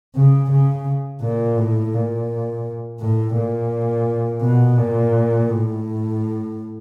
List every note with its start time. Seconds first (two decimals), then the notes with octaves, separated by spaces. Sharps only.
0.15 C#3
0.51 C#3
1.22 A#2
1.58 A2
1.93 A#2
3.00 A2
3.36 A#2
4.42 B2
4.78 A#2
5.50 A2